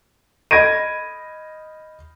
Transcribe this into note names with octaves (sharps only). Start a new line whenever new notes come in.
D#5 B5 G#6 A#6 D7 D#7